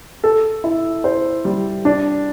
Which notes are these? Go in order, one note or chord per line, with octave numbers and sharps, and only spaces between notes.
A4
E4
C5
G3
D4